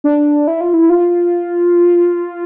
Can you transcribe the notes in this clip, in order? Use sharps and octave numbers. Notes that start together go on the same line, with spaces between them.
D4
E4
F4
E4
F4